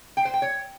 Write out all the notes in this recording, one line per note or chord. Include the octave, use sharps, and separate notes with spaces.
G5
C5
G5
C#5